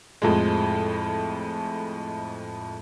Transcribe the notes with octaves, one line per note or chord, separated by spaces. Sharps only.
F2 A2 F3 G#3